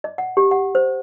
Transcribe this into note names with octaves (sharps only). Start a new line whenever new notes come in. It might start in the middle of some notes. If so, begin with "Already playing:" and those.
D#5
F#5
G4
F#5
C5